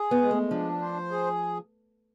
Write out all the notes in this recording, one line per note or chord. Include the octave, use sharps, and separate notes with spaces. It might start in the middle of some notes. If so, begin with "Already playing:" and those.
Already playing: G#4
B3
G#3
A3
F3 D4
C5
G#4